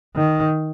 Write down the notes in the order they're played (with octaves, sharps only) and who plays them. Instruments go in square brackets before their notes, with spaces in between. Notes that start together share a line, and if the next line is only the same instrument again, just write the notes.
[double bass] D#3